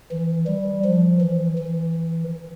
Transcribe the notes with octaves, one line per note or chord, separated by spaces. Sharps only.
E3
G3
F3
E3
E3